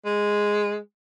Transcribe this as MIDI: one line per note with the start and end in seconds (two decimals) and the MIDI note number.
0.05 0.77 56